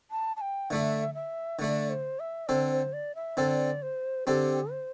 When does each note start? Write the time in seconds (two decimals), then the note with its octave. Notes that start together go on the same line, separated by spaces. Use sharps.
0.11 A5
0.36 A5
0.41 G5
0.70 D3 A3 D4 E5
1.14 E5
1.59 D3 A3 D4 D5
1.89 C5
2.19 E5
2.48 D3 C4 A4 C5
2.71 C5
2.93 D5
3.15 E5
3.37 D3 C4 A4 D5
3.82 C5
4.27 D3 C4 G4 A4
4.71 C5